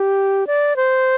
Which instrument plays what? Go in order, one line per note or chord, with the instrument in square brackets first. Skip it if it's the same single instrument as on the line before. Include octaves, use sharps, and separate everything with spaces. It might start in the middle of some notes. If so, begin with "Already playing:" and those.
Already playing: [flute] G4
D5
C5